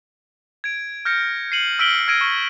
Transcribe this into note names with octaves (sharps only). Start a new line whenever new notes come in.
G#6 D7
F6 G6 A#6 C#7
C7 C#7 D#7 F#7
E6 F6 B6 D7 F#7 G7
E6 F6 G#6 A#6 D7 D#7
C#6